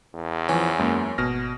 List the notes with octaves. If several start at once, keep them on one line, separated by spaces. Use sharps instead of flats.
E2
E3 F3 C#4
F#2 G#3 A#3
G#1 B2 F6 A#6